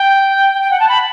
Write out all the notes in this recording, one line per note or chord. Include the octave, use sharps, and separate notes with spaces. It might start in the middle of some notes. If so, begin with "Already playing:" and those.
Already playing: G5
G5
F#5
A5
B5